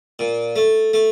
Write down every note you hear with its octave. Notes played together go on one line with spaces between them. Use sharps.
A#2
A3
A3